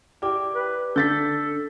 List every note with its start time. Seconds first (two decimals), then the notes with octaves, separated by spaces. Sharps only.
0.22 E4 G4 D5 G5 D6
0.55 B4
0.96 D3 A4 G6 A6 B6